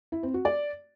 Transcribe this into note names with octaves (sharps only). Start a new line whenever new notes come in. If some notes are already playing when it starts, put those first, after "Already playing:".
E4
C4
F#4
D5